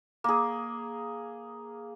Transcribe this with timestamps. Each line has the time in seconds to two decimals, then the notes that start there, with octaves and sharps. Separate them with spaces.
0.24 A#3 G#4